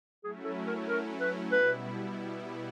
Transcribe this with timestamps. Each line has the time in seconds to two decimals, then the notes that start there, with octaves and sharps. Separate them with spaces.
0.23 F#3 A3 C#4 E4 G#4
0.44 A4
0.67 A#4
0.88 A#4
1.20 B4
1.52 B2 G3 B3 E4 B4